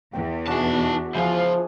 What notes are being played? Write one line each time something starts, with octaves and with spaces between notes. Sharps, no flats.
E2 G5
B2 D4 D#4 F#4 G#4 A5
C#2 F3 E4 F4 G#4 F5